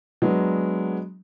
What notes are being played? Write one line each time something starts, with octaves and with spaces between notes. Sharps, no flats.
F#3 G#3 B3 D4